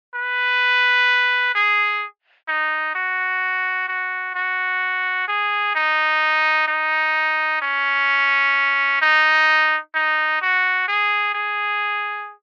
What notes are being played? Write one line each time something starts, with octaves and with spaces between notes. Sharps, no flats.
B4
G#4
D#4
F#4
F#4
F#4
G#4
D#4
D#4
C#4
D#4
D#4
F#4
G#4
G#4